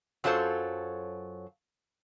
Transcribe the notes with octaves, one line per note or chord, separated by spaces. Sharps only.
F#2 F#3 F4 A4 C5 C#5